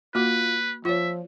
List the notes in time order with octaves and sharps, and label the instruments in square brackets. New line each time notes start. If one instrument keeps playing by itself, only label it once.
[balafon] A#3 F#4 [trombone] F4 [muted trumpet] B4
[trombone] F3 [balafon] F4 C#5 [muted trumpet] E5